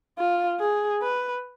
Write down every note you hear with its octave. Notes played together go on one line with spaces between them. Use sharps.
F4
G#4
B4